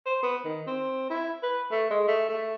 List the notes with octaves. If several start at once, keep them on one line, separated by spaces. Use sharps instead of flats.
C5
B3
D#3
C4
E4
B4
A3
G#3
A3
A3